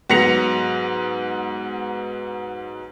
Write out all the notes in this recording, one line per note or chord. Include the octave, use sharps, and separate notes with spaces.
G#2 F#3 B3 A#6 C#7 F7